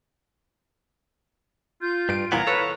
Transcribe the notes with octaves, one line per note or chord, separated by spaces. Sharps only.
F4 G6
G2 C7 D7
C2 A#2 E3 B3 F5 A#5 G#6
A4 B4 C#5